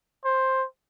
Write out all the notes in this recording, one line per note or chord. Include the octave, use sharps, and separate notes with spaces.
C5